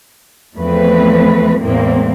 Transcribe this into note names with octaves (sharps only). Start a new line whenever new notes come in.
E2 F3 A3 C4 B4
E2 A2 E3 G#3 A#3 C4